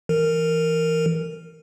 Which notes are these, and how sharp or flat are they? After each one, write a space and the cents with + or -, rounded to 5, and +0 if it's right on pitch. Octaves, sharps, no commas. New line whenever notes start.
E3 +0 A#4 -15